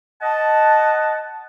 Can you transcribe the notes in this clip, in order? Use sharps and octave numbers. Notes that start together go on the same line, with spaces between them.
D#5 F#5 A5